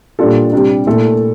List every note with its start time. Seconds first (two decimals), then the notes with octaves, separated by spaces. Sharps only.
0.19 A#2 G3 D4 F4 A4
0.53 C3 G3 D4
0.87 A#2 A3 E4 A4